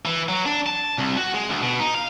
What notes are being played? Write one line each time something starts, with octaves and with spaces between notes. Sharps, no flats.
E3
F#3
D4
A5
C2
F#4
G#3
D2
B2
D#4
F5